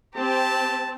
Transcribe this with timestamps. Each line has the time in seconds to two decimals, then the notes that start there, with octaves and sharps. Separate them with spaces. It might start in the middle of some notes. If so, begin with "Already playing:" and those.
0.16 C4 G4 A5